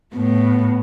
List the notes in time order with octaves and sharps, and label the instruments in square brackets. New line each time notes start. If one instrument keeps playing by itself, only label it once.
[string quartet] A2 [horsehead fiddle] B3